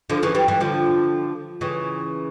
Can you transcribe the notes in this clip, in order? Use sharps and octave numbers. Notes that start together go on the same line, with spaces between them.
D3 F3
C#3 E3
E3 G3
E3 G3
D3 F3
C#3 E3